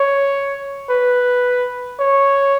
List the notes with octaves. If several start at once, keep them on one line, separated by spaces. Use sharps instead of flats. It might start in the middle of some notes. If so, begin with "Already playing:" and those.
Already playing: C#5
B4
C#5